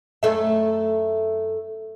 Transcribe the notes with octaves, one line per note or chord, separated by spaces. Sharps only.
F#2 A3 E5